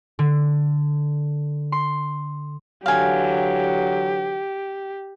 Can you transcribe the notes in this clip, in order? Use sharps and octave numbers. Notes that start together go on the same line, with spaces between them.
D3
C6
D3 E3 F#3 G4 F5 G#5